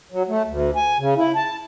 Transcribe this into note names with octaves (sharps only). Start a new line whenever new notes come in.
F#3
A3
D2
G#5
C#3
E4
A5